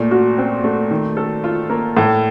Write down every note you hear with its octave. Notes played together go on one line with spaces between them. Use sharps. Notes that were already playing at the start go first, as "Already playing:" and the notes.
Already playing: A#2 A3
F#4
C4
A3
D#3
A4
F4
A#3
A2